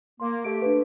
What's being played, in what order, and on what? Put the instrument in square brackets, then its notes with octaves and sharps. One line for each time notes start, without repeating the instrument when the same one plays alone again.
[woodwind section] A#3 [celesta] C6
[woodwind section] A3 G4 [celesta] D7
[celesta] D4 B4